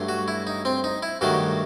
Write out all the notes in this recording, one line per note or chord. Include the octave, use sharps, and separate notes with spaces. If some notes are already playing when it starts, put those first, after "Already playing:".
Already playing: G2 F#3 A3
F#4
E4
D#4
C4
D#4
E4
G2 D#3 F#3 A3 F#4